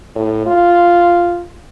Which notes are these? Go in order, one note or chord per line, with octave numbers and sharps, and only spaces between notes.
A2
F4